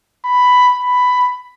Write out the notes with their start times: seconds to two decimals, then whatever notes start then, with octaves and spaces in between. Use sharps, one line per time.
0.25 B5
0.80 B5